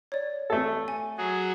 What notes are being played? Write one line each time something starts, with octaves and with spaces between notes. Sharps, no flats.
C#5 D5
A3 A4
G#5
F#3 F#4 G#4